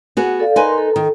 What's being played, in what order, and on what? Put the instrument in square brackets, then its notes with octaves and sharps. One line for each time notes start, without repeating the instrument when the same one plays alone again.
[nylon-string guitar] B3 F#4 G#4 [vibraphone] F#5
[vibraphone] A4 D5 F5
[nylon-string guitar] D#4 B4 G#5 [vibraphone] A#4 C6
[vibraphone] A4
[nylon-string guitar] D#3